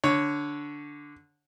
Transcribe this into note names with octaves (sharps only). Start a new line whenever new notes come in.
D3 C#5